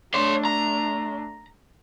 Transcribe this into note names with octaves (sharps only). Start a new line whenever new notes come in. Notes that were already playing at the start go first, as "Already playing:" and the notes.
A3 D4 C#5 C6
A#5